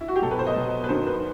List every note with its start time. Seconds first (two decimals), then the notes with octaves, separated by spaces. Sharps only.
0.01 E4
0.08 F#4
0.16 G4
0.22 B2 F#3 A4
0.31 B4
0.39 C5
0.47 D#5
0.56 B2 F#3
0.84 B4
0.89 F#2 D#3 F#3 C5
1.07 B4